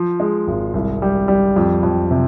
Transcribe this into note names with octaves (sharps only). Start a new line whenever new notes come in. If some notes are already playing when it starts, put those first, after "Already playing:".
Already playing: F3
G#3
G#1
C2
G3
G3
F2
F2
C3